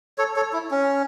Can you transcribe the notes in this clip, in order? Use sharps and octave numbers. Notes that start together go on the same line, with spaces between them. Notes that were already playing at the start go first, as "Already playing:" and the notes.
A4 C#5
A4 C#5
E4
C#4